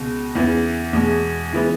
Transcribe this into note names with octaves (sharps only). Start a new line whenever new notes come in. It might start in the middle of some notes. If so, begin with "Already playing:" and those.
Already playing: C#2 B2 G#3
E2 C#3 E3 B3
E2 B2 G#3
C#3 E3 G#3 B3